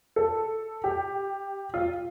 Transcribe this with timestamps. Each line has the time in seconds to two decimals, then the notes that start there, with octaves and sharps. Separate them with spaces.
0.16 A4
0.84 G4
1.74 F4